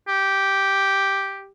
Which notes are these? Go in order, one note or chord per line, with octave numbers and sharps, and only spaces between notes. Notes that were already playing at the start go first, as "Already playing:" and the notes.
G4